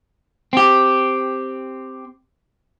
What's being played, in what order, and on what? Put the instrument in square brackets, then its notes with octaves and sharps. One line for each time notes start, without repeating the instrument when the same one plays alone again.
[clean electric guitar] C4 G4